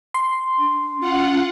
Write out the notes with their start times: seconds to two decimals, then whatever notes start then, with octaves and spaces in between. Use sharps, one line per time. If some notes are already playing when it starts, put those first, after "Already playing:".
0.14 C6
0.58 D4
1.00 C#4 F4 F#5